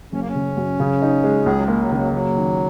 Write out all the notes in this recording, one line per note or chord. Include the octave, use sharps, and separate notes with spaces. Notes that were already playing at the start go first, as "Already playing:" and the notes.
F#1 C#4
A#3
C#4
C#3
F#2
C#3
D#4
G#3
C#2 G#4
F#3
G#3
A#3
F#3
D#3
C#3 F#3
F#1 F#3
D#3